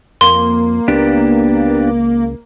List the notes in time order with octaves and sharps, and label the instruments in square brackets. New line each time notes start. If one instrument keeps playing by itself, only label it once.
[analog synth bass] F2 [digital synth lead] A#3 [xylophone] C6
[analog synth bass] C#2 [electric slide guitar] B3 D4 G4